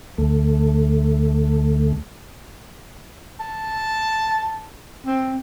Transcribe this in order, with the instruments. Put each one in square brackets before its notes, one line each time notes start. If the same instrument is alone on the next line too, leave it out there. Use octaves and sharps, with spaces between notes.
[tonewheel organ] D2 A3
[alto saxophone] A5
C4